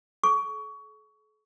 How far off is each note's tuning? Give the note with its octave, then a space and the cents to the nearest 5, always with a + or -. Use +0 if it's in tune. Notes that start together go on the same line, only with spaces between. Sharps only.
A4 -45 C#6 +20